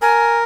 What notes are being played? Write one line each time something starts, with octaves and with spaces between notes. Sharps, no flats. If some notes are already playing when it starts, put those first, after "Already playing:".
A#4 G#5